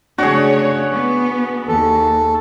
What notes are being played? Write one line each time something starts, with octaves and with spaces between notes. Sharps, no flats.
C#3 A3 D4 F#4 G#4 C#5
B3
D#2 A4